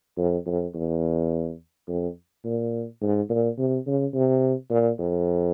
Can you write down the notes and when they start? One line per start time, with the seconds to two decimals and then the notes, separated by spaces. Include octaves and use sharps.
0.17 F2
0.46 F2
0.74 E2
1.88 F2
2.45 A#2
3.01 G#2
3.29 A#2
3.58 C3
3.86 C#3
4.14 C3
4.70 A#2
4.99 F2